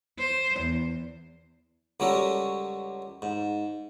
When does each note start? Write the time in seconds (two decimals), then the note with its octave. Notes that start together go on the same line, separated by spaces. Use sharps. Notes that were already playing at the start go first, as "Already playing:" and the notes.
0.19 C5
0.60 E2
2.00 C#2 F#3 G3 C#4 A4 A#4
3.22 G#2